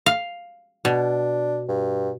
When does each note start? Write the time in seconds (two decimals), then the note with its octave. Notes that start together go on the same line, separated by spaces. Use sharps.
0.06 F5
0.85 B2 D4
1.68 G2